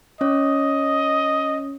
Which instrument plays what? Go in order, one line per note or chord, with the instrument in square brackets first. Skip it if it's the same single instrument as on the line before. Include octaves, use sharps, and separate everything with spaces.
[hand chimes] C#4 C#5 [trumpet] D#5